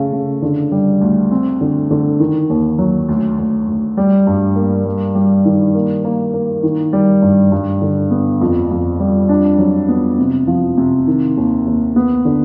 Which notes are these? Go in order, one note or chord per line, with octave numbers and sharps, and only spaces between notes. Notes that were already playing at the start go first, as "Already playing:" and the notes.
Already playing: C#3 A3
C#3
D3
G3
D2
C4
D3
D3
D#3
D#2
F#3
D2
D2
D2
G3
G2
A#3
G3
G3
D#3
A#3
A#3
A#3
D#3
G3
G2
G2
D3
B3
F2
F2
G3
D4
F#3
B3
C3
F3
C3
D#3
D#2
D#2
B3
D3